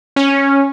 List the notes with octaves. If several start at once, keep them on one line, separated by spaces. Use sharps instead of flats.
C#4